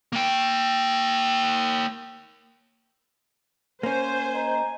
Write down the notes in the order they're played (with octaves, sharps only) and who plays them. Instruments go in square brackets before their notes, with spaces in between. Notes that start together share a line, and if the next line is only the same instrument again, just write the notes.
[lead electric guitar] A#3 G5
[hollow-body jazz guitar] A#3 C#4 [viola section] C5 [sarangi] G#5
[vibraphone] D#5 A#5